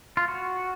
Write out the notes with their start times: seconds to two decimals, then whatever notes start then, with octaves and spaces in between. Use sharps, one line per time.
0.17 F4
0.28 F#4